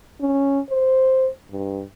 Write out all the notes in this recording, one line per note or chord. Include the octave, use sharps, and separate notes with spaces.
C#4
C5
G2